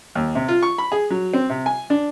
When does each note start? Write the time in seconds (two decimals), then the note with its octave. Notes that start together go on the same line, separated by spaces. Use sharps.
0.15 D#2
0.35 C3
0.48 F4
0.63 C#6
0.78 B5
0.92 G#4
1.10 F#3
1.33 C4
1.50 C3
1.66 G#5
1.90 D4